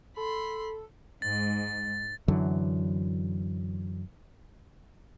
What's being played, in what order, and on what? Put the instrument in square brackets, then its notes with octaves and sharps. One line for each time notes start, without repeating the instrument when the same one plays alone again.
[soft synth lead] A4 [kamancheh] B5 C6
[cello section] G#2 [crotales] A6
[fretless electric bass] F#2 D3 E3 F#3